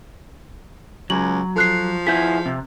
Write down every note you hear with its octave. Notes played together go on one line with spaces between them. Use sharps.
C#2 F#3 F#7
F3 A4 F#6 C7
E4 G#4 G6 B6
C3